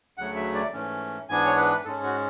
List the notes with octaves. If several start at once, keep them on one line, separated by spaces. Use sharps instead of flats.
D2 C#3 F#3 A3 F#5
E5
D5
G#2 E3 A3 C#4
G#2 E3 B3 D4 G#5
C#5
B4
G#2 G#3 C#4 A4
F#4